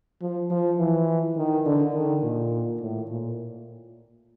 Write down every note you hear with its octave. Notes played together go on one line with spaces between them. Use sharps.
F3
F3
E3
D#3
D3
D#3
A#2
A2
A#2